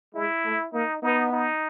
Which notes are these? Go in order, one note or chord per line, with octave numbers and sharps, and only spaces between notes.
G#3 E4
A3
A#3 D#4
B3 D#4
D#4